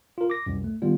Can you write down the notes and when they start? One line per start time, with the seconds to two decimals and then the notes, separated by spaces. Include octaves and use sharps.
0.18 F4 A#4
0.30 D6 A#6
0.46 C2 F#2
0.64 A3
0.82 D#3 G3 B3 F4